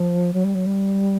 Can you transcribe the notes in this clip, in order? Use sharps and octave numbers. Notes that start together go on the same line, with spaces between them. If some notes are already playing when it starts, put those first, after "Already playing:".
Already playing: F3
F#3
G3
F#3
G3